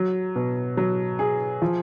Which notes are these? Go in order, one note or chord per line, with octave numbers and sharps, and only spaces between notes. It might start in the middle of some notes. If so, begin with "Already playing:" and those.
Already playing: F#3
B2
F#3
G#4
F3